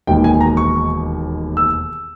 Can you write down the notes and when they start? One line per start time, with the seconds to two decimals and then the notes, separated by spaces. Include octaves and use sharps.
0.07 E1 D#2 D#3 G5
0.24 G#5
0.41 A#5
0.57 C#6
1.57 E6